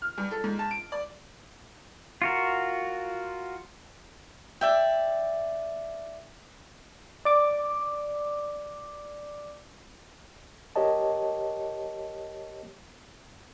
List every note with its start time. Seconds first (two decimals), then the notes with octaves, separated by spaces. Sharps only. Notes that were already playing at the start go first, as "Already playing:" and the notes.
0.02 F6
0.18 G2
0.31 A4
0.44 G#2
0.59 A5
0.71 D7
0.92 D5
2.22 F4 F#4 A#4
4.61 D5 E5 G5
7.25 D5 D6
10.76 G4 A#4 C#5 D#5 A5